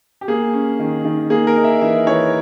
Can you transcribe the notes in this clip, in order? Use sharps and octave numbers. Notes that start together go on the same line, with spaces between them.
G4
A#3 G#4
C#4
D#3
D#3
A#3 G#4
A#4
D#4
E5
E3 E5
E3 C#5